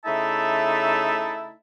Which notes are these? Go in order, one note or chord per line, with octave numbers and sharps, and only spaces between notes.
C#3 A3 D#4 E4 E5 A5